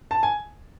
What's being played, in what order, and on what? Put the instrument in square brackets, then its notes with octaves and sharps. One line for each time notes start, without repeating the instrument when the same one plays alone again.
[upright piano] A5
G#5